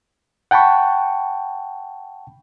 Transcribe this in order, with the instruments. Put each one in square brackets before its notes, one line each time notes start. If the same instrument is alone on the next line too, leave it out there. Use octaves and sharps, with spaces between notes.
[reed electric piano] F#5 G5 A5 B5 C#6